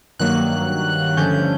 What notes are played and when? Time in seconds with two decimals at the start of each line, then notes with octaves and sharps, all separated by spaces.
0.19 G2 D#3 F#3 A#3 F#6
1.17 G2 D3 F3 A3 C#4 G6